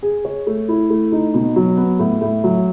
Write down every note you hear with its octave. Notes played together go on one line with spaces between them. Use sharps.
G#4
C#5
A3
E4
A3
D#4
B2
F#3
B3
A2
A2
F#3